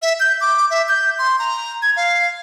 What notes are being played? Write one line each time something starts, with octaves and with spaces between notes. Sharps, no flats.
E5
G6
D6
E5
G6
C6
A#5
G#6
F5